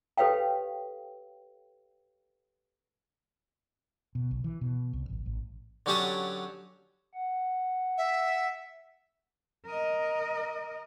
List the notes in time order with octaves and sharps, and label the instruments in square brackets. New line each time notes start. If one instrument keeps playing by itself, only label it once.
[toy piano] G4 A4 B4 C#5 F5 G5
[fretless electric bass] B2
B1
E3
B2
C2
A1
A1
[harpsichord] D3 F#3 C#4 G4 A5 D#6
[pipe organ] F#5
[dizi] E5
[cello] A#4 D#5